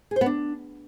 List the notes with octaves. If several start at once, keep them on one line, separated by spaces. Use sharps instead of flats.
G#4
C5
B3
D4